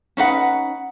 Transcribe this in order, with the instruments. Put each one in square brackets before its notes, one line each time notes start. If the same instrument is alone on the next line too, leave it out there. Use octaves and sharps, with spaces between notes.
[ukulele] C#4 D#4 B4 F#5